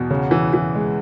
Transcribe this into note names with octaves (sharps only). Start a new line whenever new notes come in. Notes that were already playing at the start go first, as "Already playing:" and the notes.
Already playing: E2 B2
C#3
E3
E3
G#3